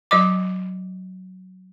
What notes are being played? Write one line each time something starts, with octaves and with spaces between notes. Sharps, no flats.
F#3 D#5 D6